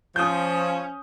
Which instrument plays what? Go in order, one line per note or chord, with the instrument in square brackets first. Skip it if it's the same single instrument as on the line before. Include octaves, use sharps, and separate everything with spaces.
[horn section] F3 [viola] C#4 [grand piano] D#6 G6